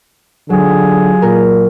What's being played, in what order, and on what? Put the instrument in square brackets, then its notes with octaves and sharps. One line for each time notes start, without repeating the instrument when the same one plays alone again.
[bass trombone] D3 [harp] F#3 [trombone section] F4 G4 G#4
[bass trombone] A#2 [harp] A#4